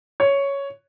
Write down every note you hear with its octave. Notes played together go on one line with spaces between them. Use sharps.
C#5